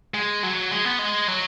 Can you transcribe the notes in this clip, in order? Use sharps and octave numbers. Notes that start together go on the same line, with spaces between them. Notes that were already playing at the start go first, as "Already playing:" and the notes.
G#3
F#3
G#3
B3
G#3
F#3